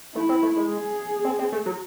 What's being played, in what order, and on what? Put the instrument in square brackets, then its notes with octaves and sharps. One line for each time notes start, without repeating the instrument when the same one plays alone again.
[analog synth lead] A3 [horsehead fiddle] E4
[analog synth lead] C4
A3
G#3
[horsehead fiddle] G#4
[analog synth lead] C4
C4
A3
F#3